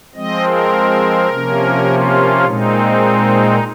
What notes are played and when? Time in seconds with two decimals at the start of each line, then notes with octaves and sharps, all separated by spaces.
0.15 F3 G#3 C4 D#5
0.44 A#4
1.30 C3 F3 A#3 C#4
1.86 F4
2.44 A#2 G#3 C4 D#4